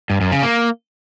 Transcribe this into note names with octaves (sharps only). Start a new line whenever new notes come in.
G2
F#2
C#3
A#3